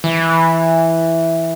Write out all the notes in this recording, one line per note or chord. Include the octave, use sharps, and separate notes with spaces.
E3